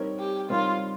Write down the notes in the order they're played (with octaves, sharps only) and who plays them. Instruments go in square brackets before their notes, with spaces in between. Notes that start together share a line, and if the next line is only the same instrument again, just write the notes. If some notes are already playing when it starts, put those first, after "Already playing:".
Already playing: [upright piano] G3 C4 D#4 A#4 C#5
[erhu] G4
[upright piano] G3 C4 D#4 A#4 C#5 [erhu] F4